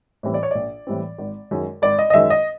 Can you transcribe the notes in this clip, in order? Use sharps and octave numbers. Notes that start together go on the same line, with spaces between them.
A2 E3 G3 C4
D5
C#5
A#1 D5
A2 E3 G3 C4
G#1
F#2 D#3 G#3
G#1 D5
D#5
D#5
F#2 D#3 G#3 E5
D#5